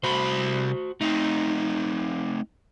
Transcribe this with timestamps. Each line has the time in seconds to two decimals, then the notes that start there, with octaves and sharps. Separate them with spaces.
0.03 C2 F#4 C5 B5
1.01 A3 C4 D#4